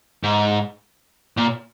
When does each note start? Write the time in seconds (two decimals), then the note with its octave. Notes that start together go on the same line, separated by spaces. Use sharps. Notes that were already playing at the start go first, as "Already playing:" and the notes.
0.23 G#2
1.37 A#2